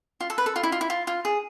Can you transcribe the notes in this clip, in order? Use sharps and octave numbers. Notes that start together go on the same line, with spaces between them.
F4
A4
B4
A4
F4
E4
F4
E4
F4
F4
G#4